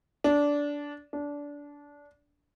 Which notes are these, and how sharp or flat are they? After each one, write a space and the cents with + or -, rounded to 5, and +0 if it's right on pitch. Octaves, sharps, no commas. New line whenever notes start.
D4 -15
D4 -20